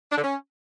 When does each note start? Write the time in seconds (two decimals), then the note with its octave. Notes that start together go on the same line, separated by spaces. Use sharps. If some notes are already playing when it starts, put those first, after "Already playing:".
0.12 D4
0.17 D3
0.23 C#4